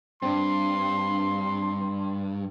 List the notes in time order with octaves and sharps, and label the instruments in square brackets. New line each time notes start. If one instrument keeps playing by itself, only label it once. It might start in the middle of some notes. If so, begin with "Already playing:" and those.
[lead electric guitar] G2 [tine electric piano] C4 D4 [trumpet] C6